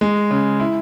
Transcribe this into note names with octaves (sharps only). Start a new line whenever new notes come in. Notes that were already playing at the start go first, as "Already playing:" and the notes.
G#3
C#3
E4